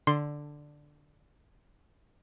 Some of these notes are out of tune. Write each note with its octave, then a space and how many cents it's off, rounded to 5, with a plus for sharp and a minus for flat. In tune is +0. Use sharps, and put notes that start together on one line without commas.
D3 +5 C6 +0